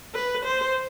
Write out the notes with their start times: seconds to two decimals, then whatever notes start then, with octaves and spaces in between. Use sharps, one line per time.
0.15 B4
0.45 C5